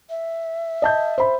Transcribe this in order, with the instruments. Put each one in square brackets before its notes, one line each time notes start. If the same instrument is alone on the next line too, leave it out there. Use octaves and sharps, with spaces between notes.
[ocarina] E5
[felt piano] D#5 A5 G6
C5 B5